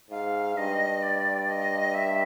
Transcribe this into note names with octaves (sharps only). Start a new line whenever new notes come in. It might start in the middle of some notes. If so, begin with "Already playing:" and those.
G#2 F5
G2 D#5
D5
D#5
E5